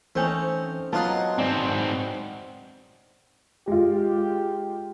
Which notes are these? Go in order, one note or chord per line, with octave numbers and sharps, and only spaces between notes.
E3 A3 C4 C#4 D#4 C5 G6
F#3 B3 D4 D#4 F4 A5 C6 F#6
G#2 C4 D5 G#5
G#3 F4 G4